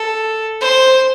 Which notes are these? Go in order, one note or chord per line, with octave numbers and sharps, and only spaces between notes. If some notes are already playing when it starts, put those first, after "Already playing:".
Already playing: A4
C5